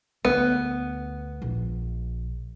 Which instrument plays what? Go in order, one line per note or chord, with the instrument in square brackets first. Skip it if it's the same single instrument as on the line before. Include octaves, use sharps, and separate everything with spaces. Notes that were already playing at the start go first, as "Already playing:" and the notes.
[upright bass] D2 [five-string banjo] B3
[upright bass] A#1